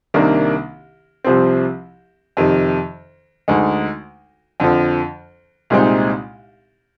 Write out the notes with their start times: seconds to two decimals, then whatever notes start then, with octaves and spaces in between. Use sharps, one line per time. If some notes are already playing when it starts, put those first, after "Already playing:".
0.14 C2 C3 D#3 A#3 D4
1.24 C2 C3 F3 C4
2.37 F2 C3 D#3
3.48 D2 D3 G#3 D#4
4.60 F2 D3 F3
5.70 C2 A#2 G#3 C4 D#4